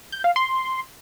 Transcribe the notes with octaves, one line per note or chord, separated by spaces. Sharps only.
G6
F5
C6